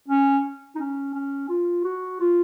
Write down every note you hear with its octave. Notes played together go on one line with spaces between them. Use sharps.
C#4
D#4
C#4
C#4
F4
F#4
F4